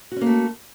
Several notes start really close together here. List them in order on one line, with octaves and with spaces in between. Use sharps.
F#4 C#4 A#3 A3